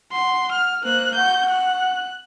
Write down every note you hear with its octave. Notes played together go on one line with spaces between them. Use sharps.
F#5 C6
F6
A#3 C5 F#6
F#5 G6
F#6